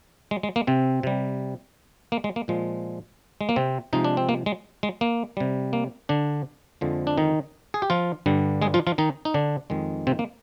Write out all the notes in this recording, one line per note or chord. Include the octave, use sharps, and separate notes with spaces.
G#3
G#3
A#3
C3 C4
C3 G3
A#3
G#3
A#3
A#2 F3 G#3
G#3
A#3
C3 C4
C3 F3 G#3 D#4
D4
C4
A#3
G#3
G#3
A#3
C3 G3
A#3
D3 D4
F2 D3 F3 G#3
D4
D#3 D#4
G#4
G4
F3 F4
G2 D3 G3
G#3 G#4
F3 F4
F3 F4
D#3 D#4
D#4
D3 D4
F2 D#3 G#3
C3 C4
A#3